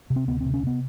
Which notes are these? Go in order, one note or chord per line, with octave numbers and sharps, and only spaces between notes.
C3
C4
D2 B3
C4
C3
C#4
C3 B3